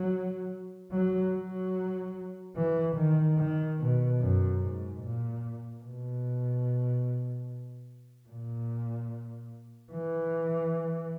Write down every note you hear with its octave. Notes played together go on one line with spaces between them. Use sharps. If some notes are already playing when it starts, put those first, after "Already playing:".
Already playing: F#3
F#3
F#3
E3
D#3
D#3
B2
F#2
G#2
A#2
B2
A#2
E3